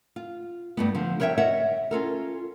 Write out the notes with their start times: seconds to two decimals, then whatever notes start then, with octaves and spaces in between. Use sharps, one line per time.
0.16 F4
0.77 G2 A3 B3
0.95 D3 F3
1.20 A#4 B4 C#5 D#5 E5 G5
1.38 C#5 D#5 E5 F#5
1.91 C#4 F4 A4 A#4